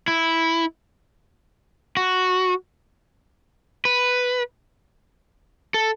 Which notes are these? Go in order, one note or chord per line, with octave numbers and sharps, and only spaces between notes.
E4
F#4
B4
A4